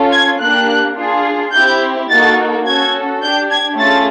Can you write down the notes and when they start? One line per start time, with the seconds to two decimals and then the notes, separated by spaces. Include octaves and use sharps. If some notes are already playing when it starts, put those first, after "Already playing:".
Already playing: C#4 F4 A4
0.13 G#6
0.41 A#3 D4 G4 F#6
0.97 D4 F4 G#4
1.54 C4 E4 G4 G6
2.10 A#3 D#4 F#4 A4 A6
2.66 C#4 F#4 A4 G#6
3.22 D4 G4 G6
3.51 G#6
3.78 A3 C#4 F4 G#4 A6